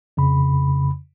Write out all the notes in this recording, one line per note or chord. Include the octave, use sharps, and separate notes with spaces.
F2 C#3 B5